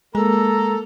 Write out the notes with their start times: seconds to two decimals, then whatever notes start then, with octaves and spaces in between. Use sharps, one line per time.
0.15 G#3 A#3 A4 A#5